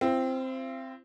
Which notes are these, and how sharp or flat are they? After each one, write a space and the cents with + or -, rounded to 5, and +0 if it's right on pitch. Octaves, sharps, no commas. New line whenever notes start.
C4 +0 F4 -45